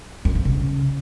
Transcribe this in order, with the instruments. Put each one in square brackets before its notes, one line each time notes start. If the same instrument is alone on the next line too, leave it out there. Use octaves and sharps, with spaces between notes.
[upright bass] F#2
F2
C#3